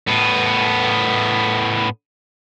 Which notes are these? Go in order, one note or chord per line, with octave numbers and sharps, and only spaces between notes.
A2 B3